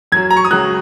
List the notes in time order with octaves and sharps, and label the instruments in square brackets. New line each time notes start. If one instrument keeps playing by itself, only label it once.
[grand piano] F#2 F#3 G#6
A#5
C#6
D#6
C#2 C#3 F#3 F#6